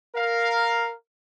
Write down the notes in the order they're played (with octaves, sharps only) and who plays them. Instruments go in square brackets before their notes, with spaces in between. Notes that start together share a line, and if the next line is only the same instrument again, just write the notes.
[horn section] A#4 F5